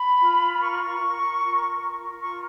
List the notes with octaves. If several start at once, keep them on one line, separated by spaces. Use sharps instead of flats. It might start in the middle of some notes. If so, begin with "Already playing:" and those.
Already playing: B5
F4
B5
A#4 C#6
A#4
F4
A#4
F4 C#6